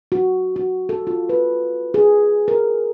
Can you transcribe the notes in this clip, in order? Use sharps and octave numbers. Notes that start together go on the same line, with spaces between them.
F#4
F#4
A4
F4
B4
G#4
A#4